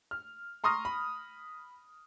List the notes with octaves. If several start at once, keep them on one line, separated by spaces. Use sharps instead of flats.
F6
A#5 C6 C#6 D#6 F6 A#6
B5